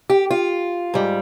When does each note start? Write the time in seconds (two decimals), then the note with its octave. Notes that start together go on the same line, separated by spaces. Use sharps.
0.10 G4
0.31 F4
0.94 G#2 G3